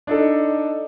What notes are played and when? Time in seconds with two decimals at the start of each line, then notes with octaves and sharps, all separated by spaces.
0.07 D4 D#4 A4